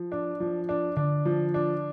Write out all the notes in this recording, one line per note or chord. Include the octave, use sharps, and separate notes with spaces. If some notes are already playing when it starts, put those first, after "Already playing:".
Already playing: F3
D4
F3
D4
D3 D4
F3
D4